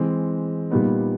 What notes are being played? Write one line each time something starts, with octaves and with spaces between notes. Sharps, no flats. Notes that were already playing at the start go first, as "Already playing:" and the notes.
Already playing: E3 G#3 C4
A#2 G3 B3 D#4